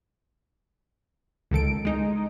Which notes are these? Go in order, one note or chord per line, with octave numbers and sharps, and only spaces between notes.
C#2 D#3 A4 D7
G#3 D#4